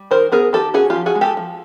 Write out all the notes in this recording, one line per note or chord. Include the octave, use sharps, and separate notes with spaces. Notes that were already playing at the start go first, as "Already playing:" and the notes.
Already playing: G3
D#3 A#4 C5
B3 G#4 A#4
D#3 G4 A4
C#4 F#4 G#4
F4 G4
F3
F#4 G#4
G#3
G4 A4
F3